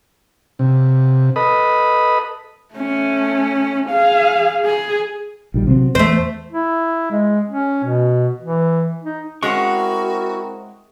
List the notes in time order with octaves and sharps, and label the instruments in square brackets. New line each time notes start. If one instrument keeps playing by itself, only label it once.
[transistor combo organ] C3
A4 B4 D#5 B5 D#6
[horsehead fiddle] A3 C#4
G#4 F5
G#4
[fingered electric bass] A#1 D#3 G3
C3 F#3 C4
[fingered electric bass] E2 [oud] A3 C5
[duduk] E4
G#3
C#4
B2
E3
D#4
[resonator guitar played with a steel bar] G#3 C#4 [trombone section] C4 E4 A#4 [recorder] F#4 [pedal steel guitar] F#5 C#6